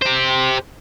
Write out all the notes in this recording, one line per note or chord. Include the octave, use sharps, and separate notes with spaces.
G4 C5